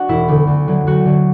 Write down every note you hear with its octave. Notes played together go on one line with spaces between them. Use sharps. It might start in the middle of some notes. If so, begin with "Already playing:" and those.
Already playing: D4 F#4
E1 E4
D2 D3
D2
D3 F#3
D2 F#4
D3 F#3